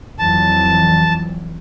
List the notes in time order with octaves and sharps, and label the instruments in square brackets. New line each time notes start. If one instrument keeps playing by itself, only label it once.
[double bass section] F2 E3 F#3 [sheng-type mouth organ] A5